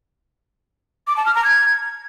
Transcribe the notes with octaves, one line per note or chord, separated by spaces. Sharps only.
D6
A5
F6
A#5
G#6